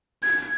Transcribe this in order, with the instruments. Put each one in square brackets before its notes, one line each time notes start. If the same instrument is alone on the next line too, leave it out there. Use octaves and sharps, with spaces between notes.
[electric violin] G#6